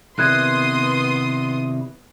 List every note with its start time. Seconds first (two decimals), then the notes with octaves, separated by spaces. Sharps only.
0.19 C3 D#3 B3 E4 C6 D#6 F#6 G#6